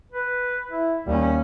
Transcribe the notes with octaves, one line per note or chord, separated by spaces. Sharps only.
B4
E4
D#2 G3 C#4